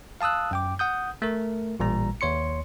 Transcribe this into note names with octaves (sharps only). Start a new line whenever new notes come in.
F5 A5 D#6 E6 F#6
F#2 G5 D6
F#5 D#6 G6
A3 A#4
A1 A#2 G3 A#5
D#2 C#5 C6 C#7